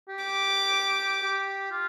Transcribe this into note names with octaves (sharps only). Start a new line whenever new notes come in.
G4
D6
G4
F4